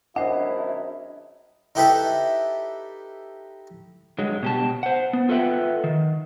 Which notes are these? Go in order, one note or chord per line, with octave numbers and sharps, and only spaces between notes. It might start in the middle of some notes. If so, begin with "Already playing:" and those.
G#1 F#2 D4 E4 C5 D#5 F#5
D#4 E4 G4 A4 B4 E5
G2 F#3 G#3
B2 G4 A5
C5 F#5
B3
F4 A4 B4 E5 F#5 G5
D#3